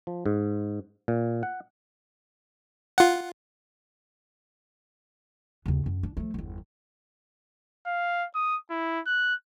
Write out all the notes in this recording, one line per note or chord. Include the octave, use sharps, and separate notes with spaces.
F3
G#2
A#2
F#5
F4 F#5
D#2 C#3
F#2
D4
F3 A3
G1 E2
F5
D#6
E4
F#6